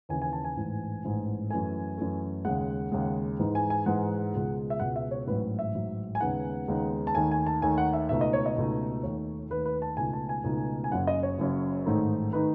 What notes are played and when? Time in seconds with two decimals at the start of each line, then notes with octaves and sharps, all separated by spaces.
0.09 D#2 C#3 E3 G#5
0.22 G#5
0.33 A5
0.44 G#5
0.56 A1 G#2 E3
1.04 A1 G#2 E3
1.50 F#2 E3 A3 G#5
1.98 F#2 E3 A3
2.45 D#2 C#3 G#3 F#5
2.92 D#2 C#3 G#3
3.39 G#2 E3 G#3 D#4
3.55 G#5
3.70 G#5
3.86 G#2 E3 G#3 D#4 F#5
4.33 C#2 B2 G#3
4.70 E5
4.80 C#2 B2 G#3 F#5
4.96 E5
5.11 C#5
5.27 A1 G#2 F#3 B4
5.59 E5
5.74 A1 G#2 F#3
6.15 G#5
6.21 D#2 C#3 G#3 B3 D#4 F#5
6.68 D#2 C#3 G#3 B3 D#4
7.07 A5
7.15 D#2 D#3 A3 D#4 G#5
7.31 G#5
7.46 A5
7.62 D#2 D#3 A3 D#4 G#5
7.78 F#5
7.93 E5
8.09 C#2 B2 A3 D#4 E5
8.21 D#5
8.33 C#5
8.46 D#5
8.56 C#2 B2 A3 D#4
9.03 D#2 D#3 A3 C#5
9.50 D#2 D#3 A3 B4
9.65 B4
9.82 A5
9.97 C#2 B2 A3 D#4 G#5
10.13 A5
10.29 G#5
10.44 C#2 B2 A3 D#4
10.84 G#5
10.91 F#1 F#2 C#3 F#5
11.07 D#5
11.23 C#5
11.39 F#1 F#2 C#3
11.86 A1 G#2 D#3 A3 D#4
12.33 D#3 A3 D#4 B4